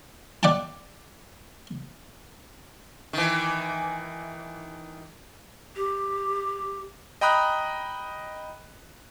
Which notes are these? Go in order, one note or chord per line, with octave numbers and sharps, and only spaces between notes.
D5 F#5 G5 A5
D#3 E3
G4
D#5 G5 A#5 B5 D#6 F#6